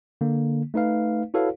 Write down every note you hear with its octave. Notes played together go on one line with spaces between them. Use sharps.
D3 A#3
A3 D#4 B4 F5
E4 F#4 A4 B4 C#5 F5